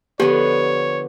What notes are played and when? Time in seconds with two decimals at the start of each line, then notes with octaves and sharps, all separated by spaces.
0.20 D3 F3 B3 G4 C#5